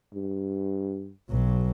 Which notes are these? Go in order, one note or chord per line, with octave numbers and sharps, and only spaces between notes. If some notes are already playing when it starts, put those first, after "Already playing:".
G2
B1 F#3